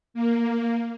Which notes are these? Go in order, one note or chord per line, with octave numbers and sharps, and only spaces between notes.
A#3